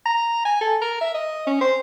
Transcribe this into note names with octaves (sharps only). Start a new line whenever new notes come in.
A#5
G#5
A4
A#4
E5
D#5
C#4
C5